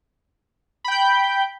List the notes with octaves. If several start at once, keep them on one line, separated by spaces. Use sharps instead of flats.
G5 B5 G6